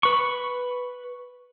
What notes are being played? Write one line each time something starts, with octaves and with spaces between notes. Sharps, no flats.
B4 C#6